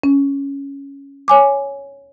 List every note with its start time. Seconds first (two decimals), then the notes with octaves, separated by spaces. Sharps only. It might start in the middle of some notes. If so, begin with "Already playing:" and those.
0.04 C#4
1.28 C#5 G#5 D6